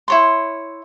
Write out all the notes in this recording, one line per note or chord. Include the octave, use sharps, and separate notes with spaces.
E4 C#5 C6